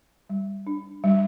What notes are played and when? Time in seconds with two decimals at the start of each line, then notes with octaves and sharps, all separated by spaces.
0.30 G3
0.67 D4
1.04 G3